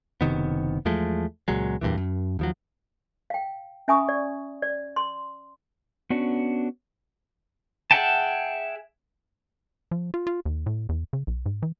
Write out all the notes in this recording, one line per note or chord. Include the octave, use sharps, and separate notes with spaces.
F#1 C3 D#3 B3
E2 F3 G#3 A3
C#2 A#2 F#3 G#3
E2 G2 A#2 E3
F#2
D#2 F3 F#3
F5 G5
C#4 E5 G#5 B5 C#6 D#6
D5
D5
C6
B3 C#4 D4 F#4
G#4 E5 F#5 G5 A5
F3
F4
F4
D#2
A2
E2
C#3
B1
G#2
E3